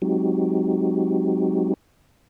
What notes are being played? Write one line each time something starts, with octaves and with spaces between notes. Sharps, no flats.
F#3 G#3 C4 D#4 F#4 G4